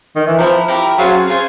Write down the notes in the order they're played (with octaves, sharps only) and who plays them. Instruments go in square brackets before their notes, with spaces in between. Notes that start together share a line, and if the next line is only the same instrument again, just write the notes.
[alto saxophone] D#3
E3
[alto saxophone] F3 [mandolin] E4 G4 A#4
[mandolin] E4 G4 A#4
[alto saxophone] F#3 [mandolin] C#4 F4 G#4 C5
[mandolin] C#4 F4 G#4 C5